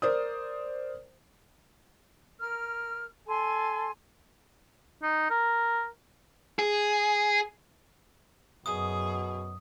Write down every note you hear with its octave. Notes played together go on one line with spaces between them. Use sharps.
A#4 C5 D5 D#6
A#4 F6
A4 G#5 C6
D#4
A#4
G#4
F#2 B2 G#4 D#6